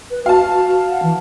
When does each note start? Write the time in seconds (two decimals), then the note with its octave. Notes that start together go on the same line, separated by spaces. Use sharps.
0.11 B4
0.26 F#4 F5 A5
0.90 F#5
1.03 E3